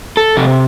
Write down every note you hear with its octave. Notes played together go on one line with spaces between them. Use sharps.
A4
C3